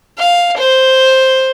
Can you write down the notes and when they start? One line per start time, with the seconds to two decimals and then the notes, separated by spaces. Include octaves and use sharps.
0.19 F5
0.58 C5